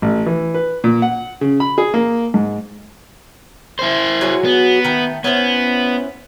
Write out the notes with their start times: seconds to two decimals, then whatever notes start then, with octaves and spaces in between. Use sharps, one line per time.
0.02 A1
0.26 E3
0.54 B4
0.84 A#2
1.02 F#5
1.41 C#3
1.60 B5
1.78 G#4
1.94 A#3
2.34 G#2
3.79 E4 C5
4.21 F#3 F#4 G#4
4.45 B3
4.84 D#3 A3
5.24 B3 C#4 E4 C5